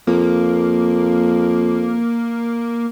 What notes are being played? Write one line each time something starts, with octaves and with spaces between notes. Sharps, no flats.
F2 A#3